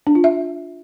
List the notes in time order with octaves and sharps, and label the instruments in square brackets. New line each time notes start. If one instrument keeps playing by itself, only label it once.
[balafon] D4
F4
E5